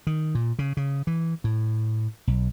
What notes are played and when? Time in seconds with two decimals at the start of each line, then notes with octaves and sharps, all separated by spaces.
0.07 D#3
0.35 A#2
0.59 C#3
0.77 C#3
1.07 E3
1.44 A2
2.27 B1